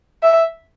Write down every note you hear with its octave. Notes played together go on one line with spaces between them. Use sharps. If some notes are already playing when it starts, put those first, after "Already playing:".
E5